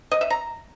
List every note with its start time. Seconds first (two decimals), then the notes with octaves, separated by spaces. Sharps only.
0.11 D#5
0.21 E5
0.30 A#5